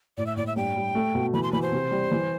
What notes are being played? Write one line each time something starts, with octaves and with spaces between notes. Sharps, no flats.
A2 D5
E5
A2 D5
E5
G2 G5
G3
A3
B2
E3 B5
C6
E3 B5
C5
C3
G3
E3